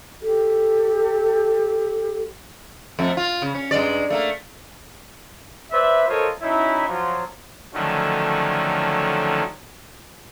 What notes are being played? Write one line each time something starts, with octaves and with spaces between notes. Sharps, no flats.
G4 A4
F2 A3
F4
C#3
C#4
G2 G#3 D5
A3 A#3
B4 C5 D5 E5
F4 A4 A#4 C5 C#5 D#5
F#3 C#4 D#4 E4
F3 F#3 F4
D3 D#3 F3 F#3 A3 C#4